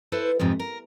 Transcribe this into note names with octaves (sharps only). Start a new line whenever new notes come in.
E4 A4 B4 C5
F2 G#2 C3 F3
A#4